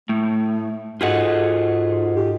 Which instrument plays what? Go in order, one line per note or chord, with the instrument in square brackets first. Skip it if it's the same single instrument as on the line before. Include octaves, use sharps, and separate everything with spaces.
[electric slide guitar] A2 [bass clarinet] A3
[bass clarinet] G#2 [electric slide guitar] F4 G#4 F#5 [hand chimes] F#4 A4 D#5
[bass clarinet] G4